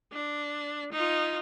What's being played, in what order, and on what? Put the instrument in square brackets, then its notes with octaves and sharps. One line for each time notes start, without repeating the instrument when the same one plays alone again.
[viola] D4
D#4 F4